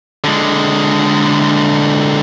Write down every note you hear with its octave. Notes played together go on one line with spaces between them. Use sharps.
D3 G#3